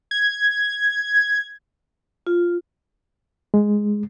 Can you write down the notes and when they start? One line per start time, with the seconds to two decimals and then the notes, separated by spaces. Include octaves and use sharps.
0.11 G#6
2.27 F4
3.54 G#3